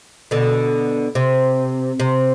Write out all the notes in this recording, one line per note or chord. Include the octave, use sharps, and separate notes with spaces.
B2 D3
C3
C3